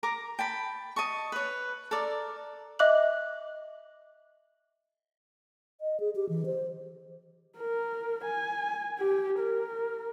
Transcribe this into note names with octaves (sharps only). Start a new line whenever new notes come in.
A#4 A#5 D6
G5 A5 B5
D#5 A5 C#6
B4 C#5
A4 A#4 D5
D#5 E5 D6 F#6 F#7
D#5
G#4
G4
E3
C5
A#4
G#5
G4
A#4